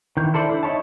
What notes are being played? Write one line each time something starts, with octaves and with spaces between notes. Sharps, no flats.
D#3 E3 G6
E4 A4 C5 D5
D4 E4
D#4 E4 C#5 A5